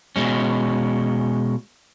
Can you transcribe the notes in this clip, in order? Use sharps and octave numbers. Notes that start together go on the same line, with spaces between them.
B2 G#3 C#4